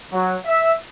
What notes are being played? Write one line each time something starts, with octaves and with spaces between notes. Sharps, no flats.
F#3
E5